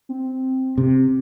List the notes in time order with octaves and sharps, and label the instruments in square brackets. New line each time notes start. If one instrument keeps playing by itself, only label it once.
[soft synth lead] C4
[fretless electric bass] C3